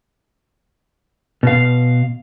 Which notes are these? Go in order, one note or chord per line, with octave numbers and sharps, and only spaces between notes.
B2 F5